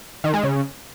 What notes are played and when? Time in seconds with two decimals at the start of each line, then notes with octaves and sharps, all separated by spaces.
0.24 D#3
0.34 G#3
0.43 C#3